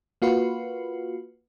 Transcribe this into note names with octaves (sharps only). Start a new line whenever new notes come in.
A#3 F4 F#4 B4